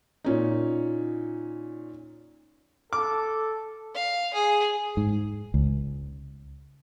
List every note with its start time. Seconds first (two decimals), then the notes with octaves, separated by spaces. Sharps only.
0.24 A#2 C#4 D#4
2.93 A4 D6
3.95 F5
4.34 G#4
4.97 G#2
5.54 C#2